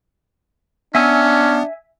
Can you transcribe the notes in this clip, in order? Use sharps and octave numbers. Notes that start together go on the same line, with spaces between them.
B3 C#4 D4 E5 G#5 E6